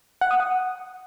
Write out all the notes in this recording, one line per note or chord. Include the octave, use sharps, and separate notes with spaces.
F#5
D#6
F#5